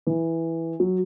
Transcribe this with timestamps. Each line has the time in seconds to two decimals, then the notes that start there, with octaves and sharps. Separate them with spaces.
0.07 E3
0.80 F#3